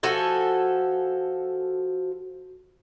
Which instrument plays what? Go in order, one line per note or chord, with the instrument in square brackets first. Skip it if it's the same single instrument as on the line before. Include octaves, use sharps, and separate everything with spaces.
[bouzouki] F3 F#4 A4 G#5